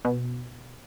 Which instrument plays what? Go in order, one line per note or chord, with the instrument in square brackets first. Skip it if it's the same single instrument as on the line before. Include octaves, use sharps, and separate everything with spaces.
[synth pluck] B2